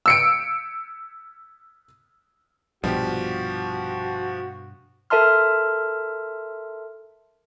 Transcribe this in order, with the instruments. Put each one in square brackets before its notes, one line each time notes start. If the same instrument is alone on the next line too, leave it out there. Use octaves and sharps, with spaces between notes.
[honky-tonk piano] E6 C#7 D7
[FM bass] A#1 [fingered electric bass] G2 B2 [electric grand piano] F3 G4 [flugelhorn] F#4
[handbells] A4 A#4 E5 A5 C6 F6